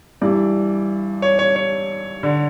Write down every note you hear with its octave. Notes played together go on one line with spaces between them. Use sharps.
G2 E3 D5
C#5
C#5
C#5
D3